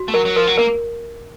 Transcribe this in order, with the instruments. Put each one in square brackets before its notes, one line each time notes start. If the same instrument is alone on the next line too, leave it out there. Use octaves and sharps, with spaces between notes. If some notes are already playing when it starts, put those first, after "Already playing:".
Already playing: [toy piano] F#4
[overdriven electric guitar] A3
[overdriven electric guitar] F#3 [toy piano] A#4
[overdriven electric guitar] F#3
[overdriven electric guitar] F3 [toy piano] A#4
[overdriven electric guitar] F#3
[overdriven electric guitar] A#3 [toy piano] A#4